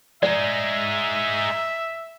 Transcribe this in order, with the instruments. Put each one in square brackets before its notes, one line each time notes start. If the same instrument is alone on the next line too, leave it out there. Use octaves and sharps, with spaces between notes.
[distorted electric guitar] G#3 D#4 [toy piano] D5 [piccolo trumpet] E5